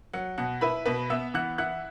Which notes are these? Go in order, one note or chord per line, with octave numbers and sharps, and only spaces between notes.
F#3 F#5
B2 F#5
E4 B4 B5
B2 B4 B5
B3 E5 E6
E3 F#5 F#6
E4 F#5 F#6